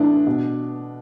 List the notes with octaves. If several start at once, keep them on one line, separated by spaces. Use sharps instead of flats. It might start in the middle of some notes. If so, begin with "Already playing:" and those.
Already playing: A2 E3 D4 E4
B2